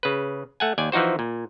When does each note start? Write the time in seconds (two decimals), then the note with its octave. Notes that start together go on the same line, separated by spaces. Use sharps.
0.03 C#3 B4
0.60 A3 F#5 G#5
0.78 D#2 D5 G#5
0.92 E3 F3 D#4 F#4 C5
1.19 A#2